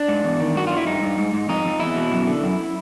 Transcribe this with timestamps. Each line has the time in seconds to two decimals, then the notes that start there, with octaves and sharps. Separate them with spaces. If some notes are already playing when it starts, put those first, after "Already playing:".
Already playing: D4
0.08 G#2
0.24 E2
0.40 D#3
0.55 G2 F#4
0.67 G2 F4
0.77 E4
0.87 G2 D#4
1.03 G2
1.18 G#2
1.33 G#2
1.49 F2 D#4
1.65 F2
1.80 E2 E4
1.96 B2
2.12 F#2
2.27 D3
2.43 F#2